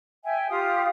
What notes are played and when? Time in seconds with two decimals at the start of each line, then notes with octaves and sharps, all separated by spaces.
0.24 E5 G5 G#5
0.50 F4 G4 F5 D#6